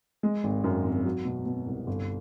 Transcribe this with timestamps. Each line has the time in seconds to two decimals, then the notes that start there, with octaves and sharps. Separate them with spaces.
0.23 G#3
0.44 G#1
0.64 F#2
0.84 G#1
1.05 F#3
1.25 B2
1.46 B2
1.67 C2
1.87 G1